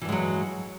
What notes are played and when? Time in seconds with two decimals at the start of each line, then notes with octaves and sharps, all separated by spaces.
0.01 E3
0.05 G2
0.09 G#3
0.12 F#3